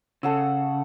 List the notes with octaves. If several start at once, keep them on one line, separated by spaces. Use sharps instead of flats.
C#3 A4 F#5 E6